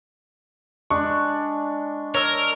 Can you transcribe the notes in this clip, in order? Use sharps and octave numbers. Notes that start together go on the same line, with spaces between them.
G#3 D4 C#6
A#4 C#5 E6 F6